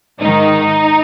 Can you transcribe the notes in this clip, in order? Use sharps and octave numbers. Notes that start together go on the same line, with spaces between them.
G#2 D#3 D#4